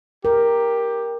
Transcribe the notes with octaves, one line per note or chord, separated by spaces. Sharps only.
G4 A#4